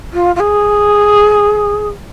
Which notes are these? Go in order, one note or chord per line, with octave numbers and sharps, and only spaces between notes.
F4
F4
G#4